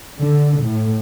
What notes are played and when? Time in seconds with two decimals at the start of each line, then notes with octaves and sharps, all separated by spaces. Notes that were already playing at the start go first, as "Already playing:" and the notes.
0.20 D3
0.64 A2